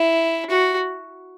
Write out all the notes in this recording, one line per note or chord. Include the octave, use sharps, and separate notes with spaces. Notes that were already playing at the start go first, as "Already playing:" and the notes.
Already playing: E4
F#4